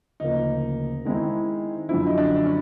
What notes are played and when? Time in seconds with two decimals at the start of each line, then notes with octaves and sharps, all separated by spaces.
0.20 D2 C#3 F3 A#3 D#4
1.05 D#3 G#3 C4 E4
1.89 F#2 D3 F3 E4
2.06 D#4
2.18 D4
2.45 C#4